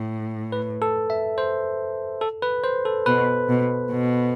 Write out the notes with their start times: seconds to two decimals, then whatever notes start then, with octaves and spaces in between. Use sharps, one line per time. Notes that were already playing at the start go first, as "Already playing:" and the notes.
Already playing: A2
0.52 B4
0.82 A4
1.10 E5
1.38 C5
2.21 A4
2.42 B4
2.64 C5
2.85 A4
3.06 B2 B4
3.49 B2
3.91 B2